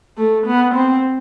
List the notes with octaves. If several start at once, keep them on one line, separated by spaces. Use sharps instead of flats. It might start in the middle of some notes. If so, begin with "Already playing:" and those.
A3
B3
C4